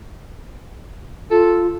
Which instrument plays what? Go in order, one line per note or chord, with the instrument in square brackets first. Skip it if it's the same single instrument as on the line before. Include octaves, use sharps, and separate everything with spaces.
[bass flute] F4 [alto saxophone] A4